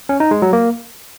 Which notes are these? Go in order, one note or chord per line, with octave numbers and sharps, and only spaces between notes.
C#4
D#4
G#3
F#3
A#3